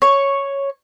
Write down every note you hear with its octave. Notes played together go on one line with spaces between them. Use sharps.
C#5